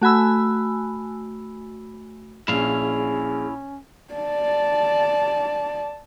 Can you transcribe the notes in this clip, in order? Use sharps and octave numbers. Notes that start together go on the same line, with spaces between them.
A3 F#4 G#5 B5 E6
A#1 C#4 E4 G#4 F5
D5 A5